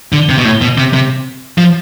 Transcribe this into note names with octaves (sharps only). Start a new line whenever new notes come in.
D3
C3
B2
A2
B2
C3
C3
F3